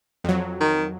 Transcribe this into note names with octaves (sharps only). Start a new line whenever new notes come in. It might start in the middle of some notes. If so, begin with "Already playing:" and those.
F2 F#3
D#3